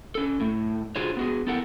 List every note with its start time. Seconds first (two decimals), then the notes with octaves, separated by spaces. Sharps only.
0.15 C#4 A4
0.40 A2 A3
0.96 D3 F4 F#4 G#4 C5 C#5
1.17 B3 F#4 G#4
1.47 B3 E4 G4 A4 A#4 F#5